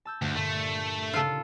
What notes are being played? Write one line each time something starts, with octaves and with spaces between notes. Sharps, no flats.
A5 E6 G6
D2 G2
G2 A#2 D3 A3
C#3 D#4 F4 A4